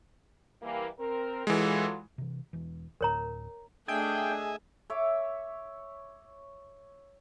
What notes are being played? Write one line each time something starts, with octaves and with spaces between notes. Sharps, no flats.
E3 G3 A#3
C4 A#4
E3 F#3 G#3 F4 A4
C3 E3
E1 E3
D2 A2 A#4 C#5 A#5
A3 D4 G#4 D#5 E5 G5 G#5
C#5 E5 D6